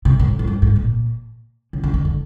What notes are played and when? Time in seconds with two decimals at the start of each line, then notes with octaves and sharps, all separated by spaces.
0.05 C3
0.19 A2
0.39 F#2
0.47 G2
0.62 G#2
0.76 A#2
1.73 C#3
1.84 D3
1.94 D#3
2.05 D3